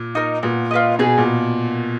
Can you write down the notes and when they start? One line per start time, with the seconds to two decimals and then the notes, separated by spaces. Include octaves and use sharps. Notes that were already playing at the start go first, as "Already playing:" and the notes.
Already playing: A#2
0.15 D#4 A#4
0.43 A#2 B3
0.71 F4 B4 D#5
0.99 B2 G#4
1.18 A#2